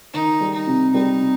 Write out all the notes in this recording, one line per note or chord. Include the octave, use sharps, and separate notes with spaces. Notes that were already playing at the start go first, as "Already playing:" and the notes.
D#3 D#4
G3
D#4
C3
G3 D#4
C3